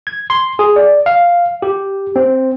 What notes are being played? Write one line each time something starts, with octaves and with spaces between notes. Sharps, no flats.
G#6
C6
G#4
D5
F5
G4
C4